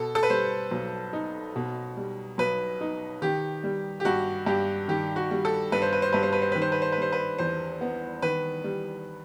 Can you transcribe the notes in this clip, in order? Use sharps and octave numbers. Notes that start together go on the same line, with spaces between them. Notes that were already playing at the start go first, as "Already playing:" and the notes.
Already playing: B2 A4
A4
B4
G3 C5
B1
D#4
B2
G3
B1 B4
D#4
D#3 G4
G3
G4
G2 F#4
G2 G4
D#3 G4
F#4
G3
A4
G2 B4
C5
B4
C5
G2 B4
C5
B4
C5
D#3 B4
C5
B4
C5
B4
G3 C5
B4
E2 C5
B3
D#3 B4
G3